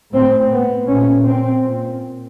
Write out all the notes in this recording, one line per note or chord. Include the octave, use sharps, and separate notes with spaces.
A2 C4
B3
A#2 C#4
C4
A#2